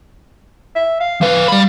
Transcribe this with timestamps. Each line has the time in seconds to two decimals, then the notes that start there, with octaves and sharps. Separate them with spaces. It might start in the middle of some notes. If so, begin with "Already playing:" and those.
0.75 E5
1.00 F5
1.21 F3 B4 F5
1.48 G3 B5